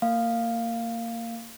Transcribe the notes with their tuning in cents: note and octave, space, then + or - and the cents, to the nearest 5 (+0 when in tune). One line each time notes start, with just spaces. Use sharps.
A#3 -25 F5 +0